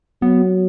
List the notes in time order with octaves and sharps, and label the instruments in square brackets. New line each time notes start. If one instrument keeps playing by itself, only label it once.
[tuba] F#3 [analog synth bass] B3